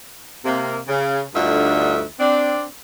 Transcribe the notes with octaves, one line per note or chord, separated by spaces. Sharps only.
C3 A#3
C#3
D2 G2 D3 D#4 F4 E5
C4 D4 D5